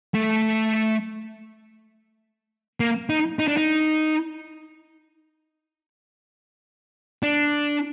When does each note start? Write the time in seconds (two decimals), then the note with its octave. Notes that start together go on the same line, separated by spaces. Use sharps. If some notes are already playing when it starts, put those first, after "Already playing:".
0.14 A3
2.80 A#3
3.09 D#4
3.39 D#4
3.48 D4
3.57 D#4
7.23 D4